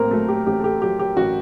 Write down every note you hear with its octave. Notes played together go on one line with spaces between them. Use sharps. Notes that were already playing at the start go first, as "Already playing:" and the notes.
Already playing: A2 A#3 C4 A#4 C5 A#5
F#3 A3 A4
G4
A1 G4
A4
G4
F#3 G4
G4
A1 F#4